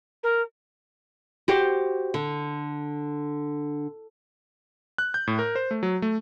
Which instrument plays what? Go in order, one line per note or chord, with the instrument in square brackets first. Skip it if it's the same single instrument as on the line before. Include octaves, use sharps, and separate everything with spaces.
[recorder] A#4
[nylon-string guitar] F#4 G4 C5
D3
[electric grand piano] F#6
G6
A2
A#4
C5
A3
F#3
A3